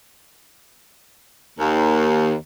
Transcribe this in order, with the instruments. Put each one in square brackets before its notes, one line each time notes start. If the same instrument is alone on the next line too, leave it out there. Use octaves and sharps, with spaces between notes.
[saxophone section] D#2